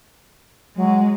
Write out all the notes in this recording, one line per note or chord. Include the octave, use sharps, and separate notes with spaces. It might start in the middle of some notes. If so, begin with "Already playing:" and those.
F#3 G#3